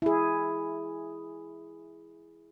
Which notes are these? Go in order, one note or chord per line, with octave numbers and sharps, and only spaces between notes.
E4 G#4